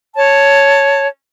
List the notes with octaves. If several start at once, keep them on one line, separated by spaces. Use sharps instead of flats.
C#5 A5